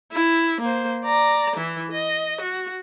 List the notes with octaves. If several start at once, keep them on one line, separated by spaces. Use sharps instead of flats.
E4
A#3 C5
D5 A#5
E3 E4
D#5
F#4